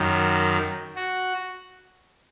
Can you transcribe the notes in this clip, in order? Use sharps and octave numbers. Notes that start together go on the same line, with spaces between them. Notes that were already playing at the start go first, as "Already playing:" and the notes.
Already playing: F#2 D#3
F#4